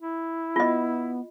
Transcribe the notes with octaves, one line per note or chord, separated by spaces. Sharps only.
E4
B3 F4 D#5